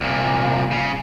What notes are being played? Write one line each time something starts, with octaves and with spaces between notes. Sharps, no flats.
C2 A#2
C#3